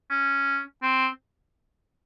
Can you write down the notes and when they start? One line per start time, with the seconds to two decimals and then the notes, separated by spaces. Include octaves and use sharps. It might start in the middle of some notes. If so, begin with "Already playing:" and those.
0.10 C#4
0.82 C4